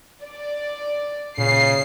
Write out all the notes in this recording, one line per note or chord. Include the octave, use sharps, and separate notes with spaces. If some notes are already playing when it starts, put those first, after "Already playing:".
D5
A#2 C#3 C7